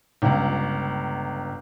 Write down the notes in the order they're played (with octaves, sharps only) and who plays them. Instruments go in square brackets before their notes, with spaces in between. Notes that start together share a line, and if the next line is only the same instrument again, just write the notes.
[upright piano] G1 C#2